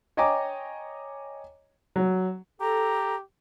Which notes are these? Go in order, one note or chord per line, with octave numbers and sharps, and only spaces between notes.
C#5 D#5 G5 G#5 A#5 D6
F#3
G4 A4 A#5